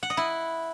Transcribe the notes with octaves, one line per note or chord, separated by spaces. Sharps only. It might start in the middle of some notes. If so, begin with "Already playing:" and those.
F#5
D#5
E4